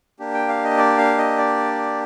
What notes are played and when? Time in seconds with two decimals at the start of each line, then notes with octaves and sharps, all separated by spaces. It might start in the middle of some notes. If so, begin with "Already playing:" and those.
0.19 A#3 D4 G4
0.34 G5
0.49 F5
0.64 D#5
0.78 D5
0.98 F5
1.18 D#5
1.38 D5